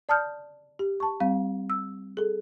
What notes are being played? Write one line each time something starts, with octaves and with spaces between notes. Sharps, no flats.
D5 A5 D#6 F6 G6
G4
A5 C#6
G3 C4 F5
E6
G#4 A4